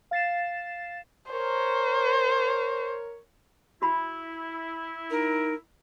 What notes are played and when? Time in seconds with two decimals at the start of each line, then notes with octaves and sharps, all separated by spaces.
0.11 F5 A6 C7 E7
1.32 A#4 C5 C#5
3.82 E4 F#4 B5
5.11 D#4 A#4